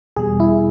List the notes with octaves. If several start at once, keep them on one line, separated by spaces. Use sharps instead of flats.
E2 B2 G3 G#4
E4